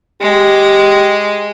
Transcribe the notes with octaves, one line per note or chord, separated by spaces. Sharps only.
G#3 G4